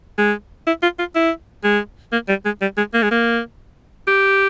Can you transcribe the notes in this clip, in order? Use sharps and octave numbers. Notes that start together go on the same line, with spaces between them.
G#3
E4
F4
F4
E4
G#3
A#3
G3
G#3
G3
G#3
A#3
G#3
A#3
G4